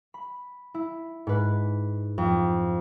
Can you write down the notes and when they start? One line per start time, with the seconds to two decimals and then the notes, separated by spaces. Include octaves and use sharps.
0.14 B5
0.74 E4
1.27 G#2 B4
2.18 F2